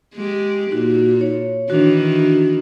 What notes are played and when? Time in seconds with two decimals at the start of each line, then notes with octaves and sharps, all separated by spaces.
0.15 G#3 G4
0.71 A#2 D#4 F#4
1.21 C#5
1.70 D#3 E3 D4 F#4